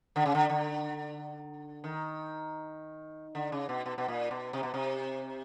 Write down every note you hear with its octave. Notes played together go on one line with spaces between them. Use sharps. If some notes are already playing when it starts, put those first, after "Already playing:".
D3
C#3
D3
D3
D#3
D3
C#3
B2
B2
B2
A#2
B2
C3
B2
C3